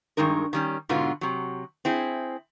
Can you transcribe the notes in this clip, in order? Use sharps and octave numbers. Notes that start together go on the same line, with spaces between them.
G2 D#3 G#3 D#4 A#4
D#3 G3 C#4
G#2 B2 D3 B3 F4
C3 F#3
C4 E4 G#4